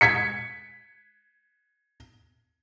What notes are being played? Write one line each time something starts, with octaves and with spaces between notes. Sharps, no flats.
G#6 B6 C#7